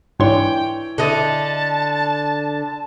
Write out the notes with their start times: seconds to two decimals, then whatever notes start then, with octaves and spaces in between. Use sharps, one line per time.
0.20 G#2 E3 D4 C#5 G5 C6
0.98 D3 D#5 A5